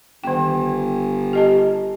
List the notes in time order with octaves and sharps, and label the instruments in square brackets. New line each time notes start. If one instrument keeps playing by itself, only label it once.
[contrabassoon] G1 [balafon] D#3 G5
[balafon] G4 D#5 A5